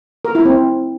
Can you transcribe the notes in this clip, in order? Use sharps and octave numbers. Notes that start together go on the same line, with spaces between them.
A#4
E4
C4